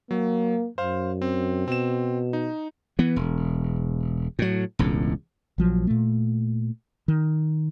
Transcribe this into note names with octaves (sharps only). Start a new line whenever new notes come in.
F#3 A#3
F#2 C5 F5
C4
B2 C4 E7
D#4
E3 B3
E1
A2 F#3
E1 C#2 A2
A#1 F3 F#3
A#2 A3
D#3